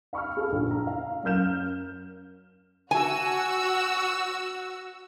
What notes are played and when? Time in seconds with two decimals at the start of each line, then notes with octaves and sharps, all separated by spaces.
0.13 F5 B5 C#6 E6 F6
0.37 G#4 A4
0.52 A#1
0.71 A#5
0.87 F5
1.23 F#2 A#4 F6 G6 E7
2.91 F#4 G#5 E6